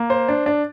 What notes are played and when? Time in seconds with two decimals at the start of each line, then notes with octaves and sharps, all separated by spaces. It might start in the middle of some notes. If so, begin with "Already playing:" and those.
Already playing: A#3
0.10 C5
0.29 D4
0.46 D4